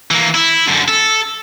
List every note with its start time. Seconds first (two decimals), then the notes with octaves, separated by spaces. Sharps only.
0.11 E3 A#3
0.35 E4
0.67 F#2 D3
0.88 A4